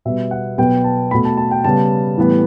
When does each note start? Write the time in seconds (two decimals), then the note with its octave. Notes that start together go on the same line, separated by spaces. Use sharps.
0.05 B2 G3 B3 E5
0.31 F#5
0.58 B2 F#3 B3 G5
0.84 A5
1.11 A3 B5
1.14 B2
1.25 A5
1.37 A5
1.51 G5
1.64 C#3 G3 B3 A5
2.18 A2 E3 G3 B3